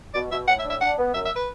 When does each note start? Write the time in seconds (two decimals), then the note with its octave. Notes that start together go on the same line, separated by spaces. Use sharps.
0.14 B2 D5
0.31 B2 E5
0.47 A2 F#5
0.59 E5
0.64 D4
0.70 E5
0.81 D4 F#5
0.98 B3
1.14 F#2 E5
1.25 E5
1.36 B4